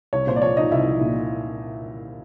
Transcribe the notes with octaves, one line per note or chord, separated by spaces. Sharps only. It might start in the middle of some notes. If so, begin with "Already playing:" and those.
C2 C#5
A#2 C5
D5
F3 C#5
F3 D#4 D#5
C2 E4 E5
F3
A#2